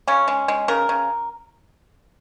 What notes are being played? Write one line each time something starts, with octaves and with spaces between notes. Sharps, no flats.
C#3 C#4
G#3
G#3
C#3 A#4
C#3